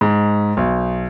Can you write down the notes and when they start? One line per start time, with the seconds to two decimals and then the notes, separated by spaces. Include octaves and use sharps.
0.01 G#2
0.57 B1